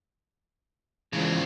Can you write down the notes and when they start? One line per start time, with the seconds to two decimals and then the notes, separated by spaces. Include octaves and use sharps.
1.13 C#3 E3 F3 G#3 D4